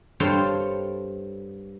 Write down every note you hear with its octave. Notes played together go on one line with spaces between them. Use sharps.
G2 F4 A4 C5 C#5 G5